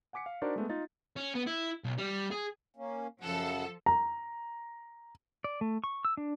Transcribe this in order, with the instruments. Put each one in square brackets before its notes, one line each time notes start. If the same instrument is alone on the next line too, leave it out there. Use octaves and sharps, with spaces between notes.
[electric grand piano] F#5 G#5 D6 B6 C#7
F5
D4 D#4 F#4 A#4 C5 D5
G#3 A3 B3
D#4 F4 A6
[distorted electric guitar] C#4
B3
E4
B1
G3
G#4
[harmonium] A#3 C#4
[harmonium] F#2 C#3 F#5 [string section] F3 A4
[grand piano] A#5
[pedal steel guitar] D5
A3
C#6
E6
D4